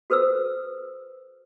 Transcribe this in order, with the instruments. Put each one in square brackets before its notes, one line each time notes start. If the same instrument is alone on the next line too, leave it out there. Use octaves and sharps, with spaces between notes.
[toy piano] F#4 A4 B4 C5 E6